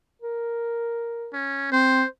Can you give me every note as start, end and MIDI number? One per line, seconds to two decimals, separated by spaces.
0.22 1.32 70
1.33 1.69 61
1.72 2.02 60
1.72 2.07 72